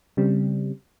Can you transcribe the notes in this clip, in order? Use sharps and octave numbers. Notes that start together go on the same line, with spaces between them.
C#3 G3 C4